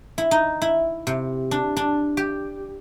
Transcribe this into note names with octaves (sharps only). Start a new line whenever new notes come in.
E4
D#4
E4
C3
D4
D4
G4